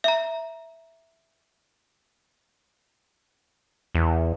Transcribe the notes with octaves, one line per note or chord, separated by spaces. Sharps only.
E5 A#5
E2